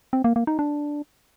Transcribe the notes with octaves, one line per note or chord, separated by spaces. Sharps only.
C4
A#3
A#3
D#4
D4